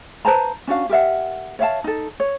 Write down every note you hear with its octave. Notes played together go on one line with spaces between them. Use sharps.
B4 C5 A5 A#5
C#4 D4 F#4 F5
G4 A#4 E5 F#5
C#5 E5 F5 A5
D#4 A4
C#5